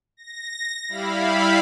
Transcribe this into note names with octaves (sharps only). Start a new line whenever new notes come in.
A#6
G3 E4 F5 B5